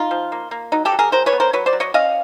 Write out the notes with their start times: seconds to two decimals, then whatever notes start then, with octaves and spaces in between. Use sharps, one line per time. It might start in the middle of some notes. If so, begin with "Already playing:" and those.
Already playing: D#4 F4
0.11 F3
0.32 A#3
0.51 A#3
0.72 F#3 D#4
0.85 G4 A4
0.92 F#3
0.99 G#4 A#4
1.12 F#3 A#4 C5
1.26 B4 C#5
1.33 B3
1.40 A#4 C5
1.53 F#3 B4 C#5
1.66 C5 D5
1.73 F#3
1.80 C#5 D#5
1.94 C#4 D#5 F5